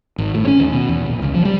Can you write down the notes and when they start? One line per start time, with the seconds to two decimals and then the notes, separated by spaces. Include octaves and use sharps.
0.18 G#1
0.35 A2
0.47 C#4
0.60 D#2
0.73 B2
0.89 E2
1.06 A#1
1.22 C#2
1.34 F3
1.45 G3